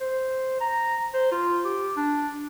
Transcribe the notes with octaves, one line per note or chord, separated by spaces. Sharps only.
C5
A#5
C5
F4
G4
D4